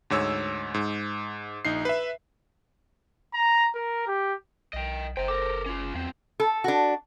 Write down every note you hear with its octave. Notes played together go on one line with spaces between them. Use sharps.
D2 G#2 C#5 E6
G#2
A#1 D#4 C7
B4 E5
A#5
A#4
G4
B1 D#5 G5
F#1 C5 G5 A#5
A4 A#4 D6
C#4 F4
E2 F#3 C4
A4
D4 F#4